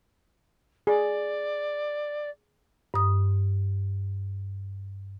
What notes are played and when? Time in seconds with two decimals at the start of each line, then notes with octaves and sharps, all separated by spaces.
0.87 G#4 D5
2.94 G2 D#6